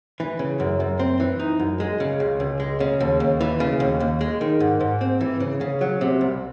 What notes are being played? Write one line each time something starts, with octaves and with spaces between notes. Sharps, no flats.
E3
C#3
F#2
F#2
C4
E3
D#4
F#2
G#3
C#3
C#2
C#2
G#3
C#3
D#2
D#2
E3
C#3
D#2
D#2
G#3
D#3
G#2
G#2
C4
E3
C#3
C#3
F#3
C3
C2